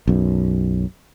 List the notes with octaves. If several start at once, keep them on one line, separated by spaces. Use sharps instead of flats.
B1 F#2